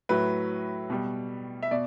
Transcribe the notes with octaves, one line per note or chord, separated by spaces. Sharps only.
A2 F#3 B4
B2 G3
E5
B2 D5